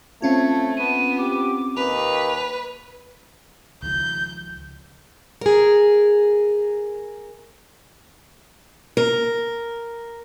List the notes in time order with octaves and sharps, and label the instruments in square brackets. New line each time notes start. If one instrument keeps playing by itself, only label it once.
[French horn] A3 [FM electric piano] C4 C#4 F4 [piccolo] G#6
[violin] B3 [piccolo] D#7
[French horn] G4 [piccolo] D6
[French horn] D#2 [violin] B4 [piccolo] F7
[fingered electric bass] C#2 D#3 F3 [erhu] G6
[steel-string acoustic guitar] G#4 A#4
A#4